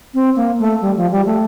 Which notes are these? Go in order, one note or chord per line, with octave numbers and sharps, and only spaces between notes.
C4
A#3
A3
G3
F3
G3
A3